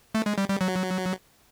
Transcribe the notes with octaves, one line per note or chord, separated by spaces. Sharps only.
A3
G#3
G3
G3
F#3